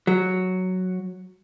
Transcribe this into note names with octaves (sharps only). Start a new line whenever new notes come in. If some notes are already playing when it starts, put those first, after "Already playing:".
F#3